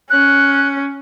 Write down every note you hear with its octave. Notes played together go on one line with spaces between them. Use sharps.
C#4 F#6